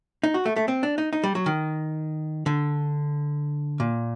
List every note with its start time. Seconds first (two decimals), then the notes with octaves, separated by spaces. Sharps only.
0.23 D#4
0.34 F#4
0.46 A3
0.56 A3
0.68 C4
0.83 D4
0.98 D#4
1.13 D#4
1.24 G3
1.35 F#3
1.46 D#3
2.46 D3
3.80 A#2